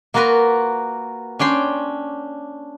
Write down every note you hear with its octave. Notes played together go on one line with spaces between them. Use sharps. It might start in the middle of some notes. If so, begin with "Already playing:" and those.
A#3 F4 F#4 A#4 B4
C#4 D4 G5 C6